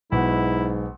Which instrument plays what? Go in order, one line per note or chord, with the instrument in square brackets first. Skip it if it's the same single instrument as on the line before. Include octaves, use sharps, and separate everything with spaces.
[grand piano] B1 B3 F#5 [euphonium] G#2 [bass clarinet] E4